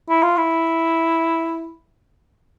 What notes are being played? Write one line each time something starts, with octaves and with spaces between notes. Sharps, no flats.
E4
F4
E4